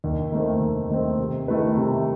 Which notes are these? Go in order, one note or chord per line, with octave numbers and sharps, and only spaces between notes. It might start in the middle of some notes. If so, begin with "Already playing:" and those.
D#2
D#3 A3 C4
D#2
D#3 A3 C4
C3
D#3 A3 E4 B4
C3